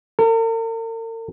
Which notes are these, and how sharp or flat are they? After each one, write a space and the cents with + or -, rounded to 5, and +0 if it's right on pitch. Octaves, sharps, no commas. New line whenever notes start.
A#4 -45